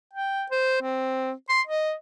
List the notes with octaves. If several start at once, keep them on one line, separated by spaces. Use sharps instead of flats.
G5
C5
C4
C6
D#5